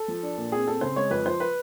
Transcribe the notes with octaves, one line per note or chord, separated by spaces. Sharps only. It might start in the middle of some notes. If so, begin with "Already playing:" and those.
Already playing: A4
F3
D4
A#2
C4 G#4
C4 A4
C#3 C5
G#3 C#5
F2 B4
F3 C5
B4